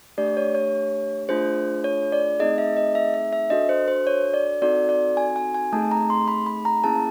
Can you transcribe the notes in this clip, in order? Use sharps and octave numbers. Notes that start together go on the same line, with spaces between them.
A3 D4 G4 D5
C#5
C#5
A3 D4 F4 G#4 C5
C#5
D5
A3 C4 D#4 G#4 D#5
E5
D#5
E5
E5
E5
D4 F#4 A4 D#5
C5
C5
C#5
D5
C4 D#4 F#4 A4 D5
D5
G#5
G#5
G#5
A3 C4 D#4 G#4 A5
A#5
C6
B5
B5
A#5
A#3 C#4 E4 G#4 A5